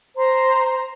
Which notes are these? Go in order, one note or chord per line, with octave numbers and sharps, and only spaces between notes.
C5 A#5 C6